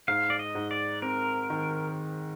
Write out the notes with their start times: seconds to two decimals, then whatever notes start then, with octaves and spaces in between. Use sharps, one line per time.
0.08 G#2 F5
0.30 D5
0.39 D#5
0.55 G#2
0.71 D5
1.02 C4 A#4
1.50 D#3